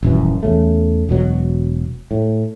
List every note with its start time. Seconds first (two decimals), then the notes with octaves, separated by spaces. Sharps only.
0.03 D#1 F#2 E3
0.43 E2 C#3 A3
1.09 E1 B2 F#3
2.11 A2